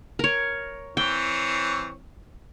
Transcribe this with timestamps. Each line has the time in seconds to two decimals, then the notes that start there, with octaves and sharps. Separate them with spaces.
0.19 A#4 C#5
0.97 E3 C4 C#5 G5